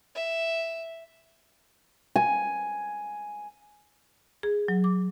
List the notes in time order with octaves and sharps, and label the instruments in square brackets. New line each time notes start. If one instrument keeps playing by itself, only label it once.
[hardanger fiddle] E5
[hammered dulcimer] G#5
[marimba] G#4
F#3
D6